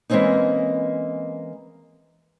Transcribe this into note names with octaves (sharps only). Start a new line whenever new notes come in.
E3 G#3 A#3 C4 C#4 D#4